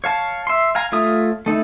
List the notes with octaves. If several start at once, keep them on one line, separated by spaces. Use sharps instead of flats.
C#5 F5 A5
E5 C6
F5 G#5 A#5
A3 F4 C#5 E5 D#6
A3 D#4 E4